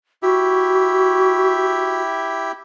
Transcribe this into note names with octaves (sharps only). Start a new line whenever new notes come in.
E4 F#4 G4 E5